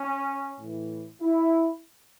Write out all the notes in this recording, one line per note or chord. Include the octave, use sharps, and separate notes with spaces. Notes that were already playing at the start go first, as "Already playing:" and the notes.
Already playing: C#4
A2 E3
E4